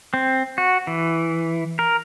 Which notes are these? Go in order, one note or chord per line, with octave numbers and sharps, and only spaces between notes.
C4
F#4
E3
A#4